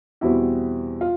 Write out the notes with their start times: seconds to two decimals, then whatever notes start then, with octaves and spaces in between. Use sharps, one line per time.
0.21 E2 B2 G3 C4 E4 F#4
1.01 F4